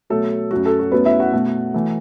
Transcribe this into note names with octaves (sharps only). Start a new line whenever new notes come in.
B2 F#3 A3 A4
F#2 F#3 A3 F#4
A4
F#4
F#2 F#3 A3 B3 B4
E4 E5
F#4 F#5
B2 A3
E3 A3